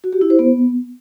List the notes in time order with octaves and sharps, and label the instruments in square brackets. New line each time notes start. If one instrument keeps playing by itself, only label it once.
[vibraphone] F#4
G4
E4
C5
B3